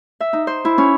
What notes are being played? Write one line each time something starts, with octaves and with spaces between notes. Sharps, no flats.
E5
D#4
C5
E4
C#4